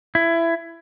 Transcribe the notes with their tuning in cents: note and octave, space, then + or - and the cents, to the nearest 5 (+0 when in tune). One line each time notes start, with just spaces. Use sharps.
E4 +20